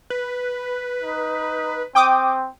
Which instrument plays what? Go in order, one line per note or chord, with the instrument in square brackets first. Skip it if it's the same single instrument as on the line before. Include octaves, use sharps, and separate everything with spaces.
[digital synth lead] B4
[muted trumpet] D#4
[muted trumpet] C4 [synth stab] G5 D6 D#6